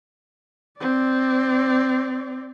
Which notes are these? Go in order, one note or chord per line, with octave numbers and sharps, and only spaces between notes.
C4 D5